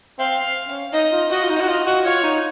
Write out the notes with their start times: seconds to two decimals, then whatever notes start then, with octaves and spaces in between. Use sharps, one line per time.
0.19 C4 F5
0.69 C#4
0.93 D#4 D#5
1.12 F4
1.31 F#4 D#5
1.44 F4
1.50 D#4
1.60 F#4
1.68 F4 D#5
1.86 F#4
2.05 F4 C#5
2.23 D#4